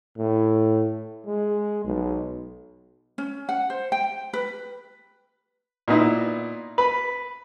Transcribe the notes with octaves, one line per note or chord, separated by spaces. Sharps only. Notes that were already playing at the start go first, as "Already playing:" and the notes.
A2
G#3
B1
C#4
F#5
C5
G5
B4
A#2 B3 D#4 E4
B4